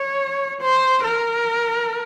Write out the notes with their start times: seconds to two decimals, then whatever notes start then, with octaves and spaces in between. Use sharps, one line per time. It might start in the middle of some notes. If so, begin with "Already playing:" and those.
Already playing: C#5
0.61 C5
1.04 A#4